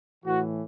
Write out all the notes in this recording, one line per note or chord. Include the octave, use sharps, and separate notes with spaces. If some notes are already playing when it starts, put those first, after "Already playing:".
A2 E3 F#4